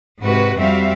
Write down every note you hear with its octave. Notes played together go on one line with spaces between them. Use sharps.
G#2 C3 F#4 B4
F2 G3 C4 F#4 E5 F5